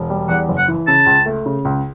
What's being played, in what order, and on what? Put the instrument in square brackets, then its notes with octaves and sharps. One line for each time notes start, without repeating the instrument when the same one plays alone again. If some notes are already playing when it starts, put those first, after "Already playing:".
Already playing: [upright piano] E1
G3
[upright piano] E2 [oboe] F#5
[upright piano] F#1
[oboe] F#5
[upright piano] E3
[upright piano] C#3 [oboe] A5
[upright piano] C#2
A3
C#3
C#2